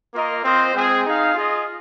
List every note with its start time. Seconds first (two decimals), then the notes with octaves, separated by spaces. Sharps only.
0.14 A#3 F4 A#4 D#5
0.44 C4 F4 C5 D#5
0.74 G#3 C4 G#4
1.05 D#4 G#4 F5
1.34 F4 G#4 D#5